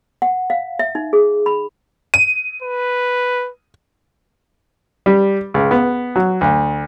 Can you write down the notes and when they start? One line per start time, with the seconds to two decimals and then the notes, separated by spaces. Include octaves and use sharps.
0.22 F#5
0.50 F5
0.79 E5
0.95 D#4
1.13 G#4
1.46 B5
2.14 D#7
2.62 B4
5.06 G3
5.54 C#2
5.71 B3
6.16 F#3
6.41 D2